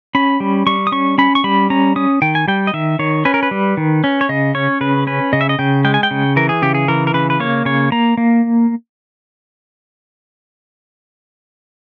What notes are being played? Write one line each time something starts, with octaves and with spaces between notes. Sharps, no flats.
C#4 B5
G3
G3 C#6
D#6
C#4 C#6
C#4 B5
C#6
G3 B5
C#4 A#5
C#4 D#6
D#3 G5
G#5
G3 G5
D#5
D#3 E5
D#3 C#5
C#4 B4
A#4
B4
G3
D#3
C#4
C#5
C#3 D#5
C#4 C#5
C#3 B4
C#4 B4
C#3 D#5
E5
D#5
C#3 G5
G#3 G5
G#5
G5
C#3
E3 A#4
G#4
C#3 G4
G#4
E3 A#4
A#4
C#3 B4
B4
A#3 C#5
C#3 C#5
A#3 A#5
A#3